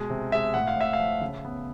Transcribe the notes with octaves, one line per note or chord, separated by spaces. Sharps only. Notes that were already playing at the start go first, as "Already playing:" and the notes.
Already playing: B2 G#3
C3
G#3 E5
A2 F#5
F5
A2 E5
F5
F3
C#3
B3